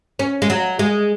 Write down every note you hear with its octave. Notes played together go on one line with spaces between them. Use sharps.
C#4
G#3
F#3
G#3